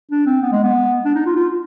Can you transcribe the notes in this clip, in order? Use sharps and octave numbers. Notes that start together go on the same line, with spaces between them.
D4
C4
B3
G#3
B3
D4
D#4
F4
F4